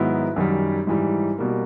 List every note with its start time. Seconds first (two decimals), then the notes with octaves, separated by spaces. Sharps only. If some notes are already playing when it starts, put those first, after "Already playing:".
Already playing: G#2 D#3 F#3 B3 E4
0.36 F#2 D#3 G3
0.87 G#2 E3 G3
1.38 B2 G3 A#3